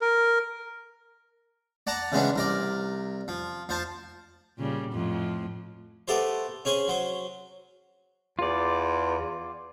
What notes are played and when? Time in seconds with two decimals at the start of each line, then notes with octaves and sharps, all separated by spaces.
0.02 A#4
1.87 D5 F#5 A5 A#5
2.12 C#3 E3 G#3 B3 C#4 D4
2.36 C2 A#4 D5
3.28 F3
3.69 F3 C5 A5
4.58 A#2 C#3 G3
4.93 F2 A2 F3
6.08 A3 B3 G4 A4 C5
6.65 C#4 G#4 C5 G#5
6.88 F#3 C5
8.39 E2 F4 D5